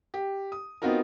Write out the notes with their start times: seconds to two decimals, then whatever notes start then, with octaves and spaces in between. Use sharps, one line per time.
0.14 G4
0.52 D#6
0.82 B3 C4 D#4 F4 F#4 A#4